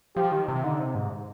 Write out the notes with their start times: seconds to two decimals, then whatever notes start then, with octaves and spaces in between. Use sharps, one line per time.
0.16 F3 G4
0.32 D#3
0.48 C3
0.63 D3 D#4
0.80 C3
0.95 G#2